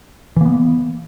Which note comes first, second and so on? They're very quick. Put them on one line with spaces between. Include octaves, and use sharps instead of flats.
E3 A#3 B3